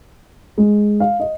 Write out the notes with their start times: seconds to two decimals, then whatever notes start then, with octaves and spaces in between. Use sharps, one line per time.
0.58 G#3
1.00 F5
1.20 D#5